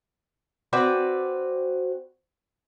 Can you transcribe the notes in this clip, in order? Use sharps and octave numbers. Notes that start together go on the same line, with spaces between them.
C4 F#4 B4 D5